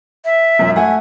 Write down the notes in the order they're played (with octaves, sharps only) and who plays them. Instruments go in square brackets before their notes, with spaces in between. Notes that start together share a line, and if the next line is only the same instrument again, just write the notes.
[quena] E5
[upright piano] E1 A#1 F#2
[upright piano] A3 E5 F#5 [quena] G#5